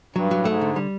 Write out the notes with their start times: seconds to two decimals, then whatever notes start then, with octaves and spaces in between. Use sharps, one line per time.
0.15 G2 F#3
0.31 F#3
0.38 A2
0.45 G#2 A3
0.61 D3
0.76 G3